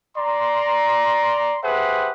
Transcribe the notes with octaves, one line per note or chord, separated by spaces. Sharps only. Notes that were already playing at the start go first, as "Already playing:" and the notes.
D5 A#5 C6
G4 G#4 B4 C5 E5 F#5